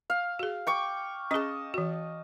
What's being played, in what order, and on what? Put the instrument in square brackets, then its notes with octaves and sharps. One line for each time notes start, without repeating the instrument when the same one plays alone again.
[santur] F5
[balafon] F#4 G#4
[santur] G5 C#6 D6
[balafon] C#4 G#4 [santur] D#5 A5
[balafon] E3 F#4